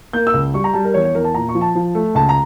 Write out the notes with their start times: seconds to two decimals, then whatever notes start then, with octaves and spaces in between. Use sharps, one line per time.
0.13 A#3 G6
0.27 E6
0.34 C#2
0.54 G3 C#6
0.64 A#5
0.74 G3 A5
0.85 A#4
0.94 E2 C#5
1.05 C#5
1.15 E2 A#4
1.24 A5
1.34 A#2 A#5
1.49 C#6
1.55 F3
1.61 A5
1.75 F3
1.95 A3
2.15 C#2 A5
2.29 A#5